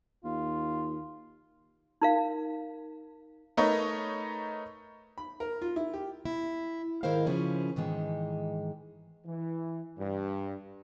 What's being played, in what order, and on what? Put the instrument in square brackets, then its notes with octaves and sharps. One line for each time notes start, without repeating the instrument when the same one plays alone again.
[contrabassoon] D#2 [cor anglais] F4
[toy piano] D#4 A#4 F5
[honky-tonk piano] A3 D#4 A#4 B4 C#5 D#5
[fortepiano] B5
A#4
F4
E4
G4
[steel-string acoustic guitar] E4
G#2 D#3 E4 A#4 C5 F5
C#3 F3 C#4 E4
G#2 D#3 E3 G#3
[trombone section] E3
G2